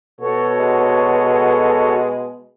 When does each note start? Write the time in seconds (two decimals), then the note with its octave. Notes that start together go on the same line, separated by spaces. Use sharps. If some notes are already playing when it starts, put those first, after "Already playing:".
0.21 B2 F#4 A4 C#5
0.59 G#3